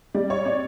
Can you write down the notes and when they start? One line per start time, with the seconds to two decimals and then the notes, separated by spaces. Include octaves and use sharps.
0.15 G3 D5
0.30 C#5
0.45 C4 D5